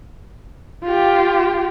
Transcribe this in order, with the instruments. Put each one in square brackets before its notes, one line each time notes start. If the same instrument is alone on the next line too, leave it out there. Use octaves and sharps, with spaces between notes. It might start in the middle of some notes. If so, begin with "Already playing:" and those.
[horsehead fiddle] F4 G4